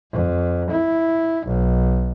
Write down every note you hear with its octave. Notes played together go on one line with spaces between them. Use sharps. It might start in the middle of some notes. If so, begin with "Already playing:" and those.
F2
E4
B1